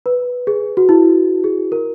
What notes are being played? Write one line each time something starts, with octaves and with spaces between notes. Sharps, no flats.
B4
G#4
F#4
E4
G#4
A#4